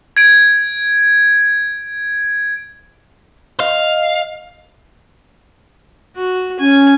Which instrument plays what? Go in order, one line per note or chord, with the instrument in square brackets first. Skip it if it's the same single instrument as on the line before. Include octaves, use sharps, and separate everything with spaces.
[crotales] G#6 D7
[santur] D#5 [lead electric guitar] F5
[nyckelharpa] F#4
[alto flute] C#4 [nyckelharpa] G#5